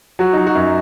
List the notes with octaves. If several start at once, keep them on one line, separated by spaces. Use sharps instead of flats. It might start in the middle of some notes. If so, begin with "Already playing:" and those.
F#3 F#4
F#3 D#4
F#4
F#2